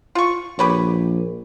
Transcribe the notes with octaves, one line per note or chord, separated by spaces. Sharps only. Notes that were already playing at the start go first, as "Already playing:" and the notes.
F4 C#6
A#1 G4 B4 C#5